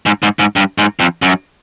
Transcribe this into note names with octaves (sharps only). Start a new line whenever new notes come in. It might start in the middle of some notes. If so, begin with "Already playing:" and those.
G#2
G#2
G#2
G2
G#2
F2
F#2